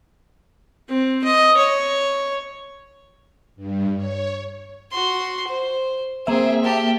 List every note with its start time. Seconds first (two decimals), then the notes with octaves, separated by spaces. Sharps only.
0.89 C4
1.24 D#5
1.57 C#5
3.56 G2
3.95 C#5
4.92 F#4 C6
5.48 C5
6.27 A#3 C4 G#4 E5
6.64 G4 A5